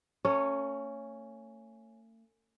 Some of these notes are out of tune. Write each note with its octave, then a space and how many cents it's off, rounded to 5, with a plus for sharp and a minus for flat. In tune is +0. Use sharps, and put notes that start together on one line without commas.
A3 +40 C#4 +0 C#5 +0